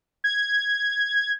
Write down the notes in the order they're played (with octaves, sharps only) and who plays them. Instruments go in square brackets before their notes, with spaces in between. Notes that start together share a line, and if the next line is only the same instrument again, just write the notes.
[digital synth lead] G#6